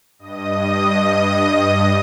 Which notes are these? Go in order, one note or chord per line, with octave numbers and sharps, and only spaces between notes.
G2 D#5 D#6